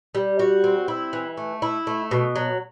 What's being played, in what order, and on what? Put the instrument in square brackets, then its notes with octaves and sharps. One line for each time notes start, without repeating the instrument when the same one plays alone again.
[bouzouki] G3
F#4
C4
E4
E3
A3
E4
A3
B2
F#3